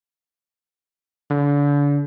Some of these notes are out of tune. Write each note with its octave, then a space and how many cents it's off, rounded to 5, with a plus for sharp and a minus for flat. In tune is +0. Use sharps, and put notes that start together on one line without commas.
D3 -35